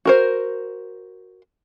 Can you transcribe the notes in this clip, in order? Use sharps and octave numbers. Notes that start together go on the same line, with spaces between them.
F#4 A#4 C5